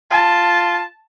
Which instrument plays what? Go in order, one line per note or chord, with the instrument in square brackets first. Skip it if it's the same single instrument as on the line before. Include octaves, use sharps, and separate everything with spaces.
[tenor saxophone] F4 [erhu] A5